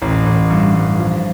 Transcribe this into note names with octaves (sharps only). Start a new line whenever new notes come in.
A1
A1
G2
G2
F3